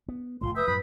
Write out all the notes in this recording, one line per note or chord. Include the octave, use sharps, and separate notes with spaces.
B3
F1 F2 A3 F4 C6
B4 E5 D#6 G6
F#2 A2 F3 B5